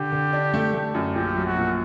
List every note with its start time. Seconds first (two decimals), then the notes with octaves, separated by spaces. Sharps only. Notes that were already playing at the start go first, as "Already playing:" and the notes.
Already playing: D3 G4
0.12 D3
0.33 D4
0.54 A3
0.74 A3
0.95 F#2
1.15 A#1 G4
1.36 F#3
1.46 F#4
1.57 A#2